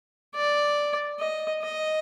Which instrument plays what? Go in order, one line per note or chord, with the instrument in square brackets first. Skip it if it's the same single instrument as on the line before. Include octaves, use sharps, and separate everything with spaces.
[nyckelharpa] D5
D#5
D#5